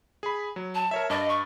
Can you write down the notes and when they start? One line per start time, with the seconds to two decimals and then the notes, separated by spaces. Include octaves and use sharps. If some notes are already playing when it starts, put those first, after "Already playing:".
0.23 G#4 B5
0.56 F#3
0.75 A5
0.91 A#4 C#5 E5
1.10 G2 D#5 A5 D6
1.29 C#6